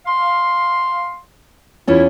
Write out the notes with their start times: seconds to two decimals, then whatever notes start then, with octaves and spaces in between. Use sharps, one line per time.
0.06 F5 C6
1.88 E2 C#4 E4 F4